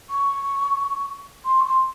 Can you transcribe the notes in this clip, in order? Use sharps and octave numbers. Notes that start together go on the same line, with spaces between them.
C#6
C6
C#6
C6